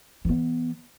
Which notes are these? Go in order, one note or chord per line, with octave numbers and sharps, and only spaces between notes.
E3 B3